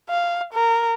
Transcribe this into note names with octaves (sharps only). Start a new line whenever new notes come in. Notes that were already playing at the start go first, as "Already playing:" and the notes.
F5
A#4